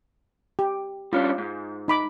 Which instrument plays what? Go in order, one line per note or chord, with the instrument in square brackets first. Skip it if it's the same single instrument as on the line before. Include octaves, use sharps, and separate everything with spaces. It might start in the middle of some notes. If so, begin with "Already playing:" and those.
[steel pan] G4
[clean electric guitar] G3 C#4 D4 [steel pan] F4
[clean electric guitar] G#2
[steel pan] D#4 B5 D6